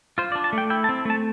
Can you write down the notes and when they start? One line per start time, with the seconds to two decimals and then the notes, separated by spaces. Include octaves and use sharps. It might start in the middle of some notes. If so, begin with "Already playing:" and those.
0.18 F4 C5
0.32 D5
0.35 D4
0.44 A5
0.53 A3
0.58 G5
0.70 E4 G5
0.84 A5
0.89 C4
1.05 A3 A5